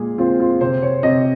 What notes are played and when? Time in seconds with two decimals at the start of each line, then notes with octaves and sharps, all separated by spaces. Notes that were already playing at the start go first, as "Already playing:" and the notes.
Already playing: A#2 G#3 G#4
0.18 C4 F4
0.40 F4
0.61 C3 C5
0.82 C#5
1.03 C3 D#5